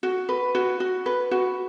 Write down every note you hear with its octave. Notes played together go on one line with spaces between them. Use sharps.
F#4
B4
F#4
F#4
B4
F#4